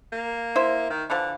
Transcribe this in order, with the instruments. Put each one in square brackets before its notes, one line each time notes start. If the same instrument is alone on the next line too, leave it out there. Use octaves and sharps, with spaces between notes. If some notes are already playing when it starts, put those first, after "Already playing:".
[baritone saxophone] A#3
[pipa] E4 C5 E5
[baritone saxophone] D#3
[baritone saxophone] D3 [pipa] E3 F3